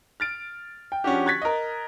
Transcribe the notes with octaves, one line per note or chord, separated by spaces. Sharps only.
F6 A6 D7
G5
F3 C#4 D4 F#4 G4
C#6 F#6 G#6 A6 B6
A#4 D#5